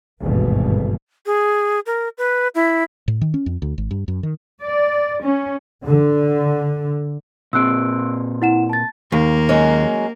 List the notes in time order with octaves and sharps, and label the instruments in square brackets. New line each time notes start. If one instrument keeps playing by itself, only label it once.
[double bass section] G#1 D2 G2 B2 E3
[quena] G#4
A#4
B4
E4
[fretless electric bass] A2
D#3
C#4
F2
D2
G#1
G2
F#2
D#3
[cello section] D5
C#4
[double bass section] D3
[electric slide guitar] A#2 C4 [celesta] E6 F#6 D7
[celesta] E4 F#5 E7
A5 A6
[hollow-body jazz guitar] D#2 [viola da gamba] A#3
[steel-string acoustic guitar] F#3 G#3 C#4